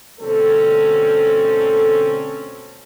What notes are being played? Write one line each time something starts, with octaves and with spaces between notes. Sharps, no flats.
G1 D2 B2 C4 C#4 A4